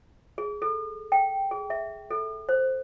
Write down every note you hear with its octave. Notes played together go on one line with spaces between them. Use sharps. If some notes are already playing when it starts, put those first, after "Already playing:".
G#4
A4
G5
G#4
E5
A4
C5